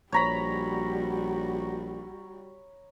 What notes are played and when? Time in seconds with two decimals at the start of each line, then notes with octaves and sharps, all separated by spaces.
0.12 A#1 G3 F#4 C#5 A#5 B5